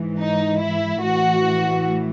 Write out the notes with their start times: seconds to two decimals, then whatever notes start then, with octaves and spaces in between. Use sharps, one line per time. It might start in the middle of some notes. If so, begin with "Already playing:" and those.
Already playing: G#2 E3
0.18 D#4
0.59 E4
1.00 A2 E3 F#4